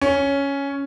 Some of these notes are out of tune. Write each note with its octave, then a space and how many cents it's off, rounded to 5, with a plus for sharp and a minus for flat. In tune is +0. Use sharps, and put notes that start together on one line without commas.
C#4 +5